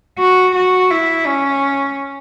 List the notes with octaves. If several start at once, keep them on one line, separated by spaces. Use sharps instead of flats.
F#4
F#4
E4
C#4